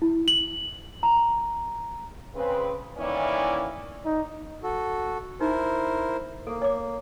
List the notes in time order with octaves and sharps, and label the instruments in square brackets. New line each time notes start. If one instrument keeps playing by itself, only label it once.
[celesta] E4
F#7
A#5
[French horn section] C#3 C4 B4
D#3 E3 A#3 C#4 E4 D5
[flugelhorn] D#4
[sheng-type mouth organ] F#4 A4
[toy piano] D#4 [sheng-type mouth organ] E4 A#4 C5
[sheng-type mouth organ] A#3 [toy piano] A4
[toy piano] C#5 D6